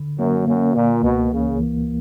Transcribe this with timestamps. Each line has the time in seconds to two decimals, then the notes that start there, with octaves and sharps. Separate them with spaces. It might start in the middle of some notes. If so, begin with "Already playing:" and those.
Already playing: D3
0.19 F#2 A#3
0.47 F#2 A#3
0.75 A#2 A#3
1.03 C#2 B2
1.32 C#3 E3
1.60 E3